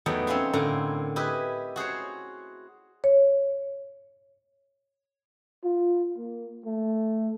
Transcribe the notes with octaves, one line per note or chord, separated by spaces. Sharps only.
E2 F#3 A3 B3 D#4 G5
C4 C#4 F4 C5 G#5
A2 D3 A#4 G#5 A#5
E4 G4 B4 D#5 G#5
F#4 G#4 C5 C#5
C#5
F4
A#3
A3